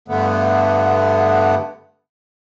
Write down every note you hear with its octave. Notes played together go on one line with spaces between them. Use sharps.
G2 D3 A3 B3